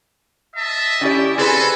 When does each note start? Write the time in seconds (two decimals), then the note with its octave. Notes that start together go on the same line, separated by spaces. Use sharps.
0.56 D#5 E5 A5
1.01 C#4 E4 G4 D5
1.38 C4 F#4 G#4 A4 B4 G#5